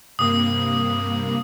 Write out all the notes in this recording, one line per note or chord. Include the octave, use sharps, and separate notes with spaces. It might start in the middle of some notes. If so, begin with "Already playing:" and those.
G2 C3 A#3 D#6